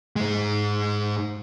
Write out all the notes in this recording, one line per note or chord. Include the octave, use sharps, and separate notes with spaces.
G#2 G#3